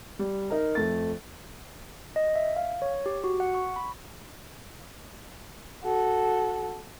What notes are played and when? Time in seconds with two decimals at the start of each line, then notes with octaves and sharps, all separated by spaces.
0.19 G3
0.50 D#4 A#4
0.75 F2 A3 A6
2.16 D#5
2.36 E5
2.56 F5
2.82 C#5
3.06 G4
3.24 F#4
3.40 F#5
3.54 C#6
3.76 B5
5.83 F#4 A4